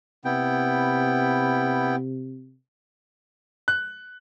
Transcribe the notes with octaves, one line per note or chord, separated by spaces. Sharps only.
C3 B3 E4 G5
F#6